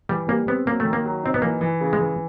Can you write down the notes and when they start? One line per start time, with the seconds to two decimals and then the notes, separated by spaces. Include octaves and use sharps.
0.09 E3 G3
0.28 G3 A#3
0.47 B3 C4
0.66 F#3 A#3
0.80 A3
0.85 D#3
0.93 A#3
1.05 F#3
1.23 C4 D#4
1.34 B3
1.42 E3 A#3
1.61 E3
1.81 C#3
1.93 G#3
1.99 E3